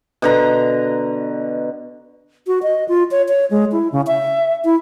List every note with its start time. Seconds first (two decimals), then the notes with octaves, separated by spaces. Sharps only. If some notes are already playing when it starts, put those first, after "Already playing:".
0.22 B2 D3 A#5
2.47 F#4
2.63 D#5
2.88 F4
3.11 C#5
3.29 C#5
3.51 G#3
3.72 E4
3.92 C#3
4.07 E5
4.65 E4